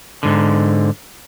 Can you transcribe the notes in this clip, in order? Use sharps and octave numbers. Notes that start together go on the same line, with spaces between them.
G#2 D3